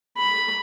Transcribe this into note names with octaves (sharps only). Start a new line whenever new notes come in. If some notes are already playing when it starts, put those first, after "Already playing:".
B5